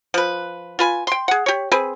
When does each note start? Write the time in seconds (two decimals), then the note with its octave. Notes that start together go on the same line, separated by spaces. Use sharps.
0.14 F3 B4
0.79 F4 B4 G#5
1.07 G5 C6
1.28 G#4 F#5
1.46 G4 C#5
1.72 C4 G#4 B4